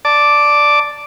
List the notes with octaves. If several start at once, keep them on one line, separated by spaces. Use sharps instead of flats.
D5 A5 D6